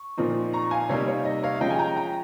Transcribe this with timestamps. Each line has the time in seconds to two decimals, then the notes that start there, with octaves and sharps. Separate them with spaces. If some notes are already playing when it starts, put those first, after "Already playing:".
Already playing: C#6
0.17 A#2 F3 C4 D#4
0.53 A#5 C#6
0.71 F5 G#5
0.89 C3 G3 A#3 D#4 C#5 F5
1.08 C#5
1.25 D#5
1.43 C#5 F5
1.56 F5
1.61 F3 G#3 C#4 D#5 G5
1.70 G#5
1.79 G5 A#5
1.97 G5 A#5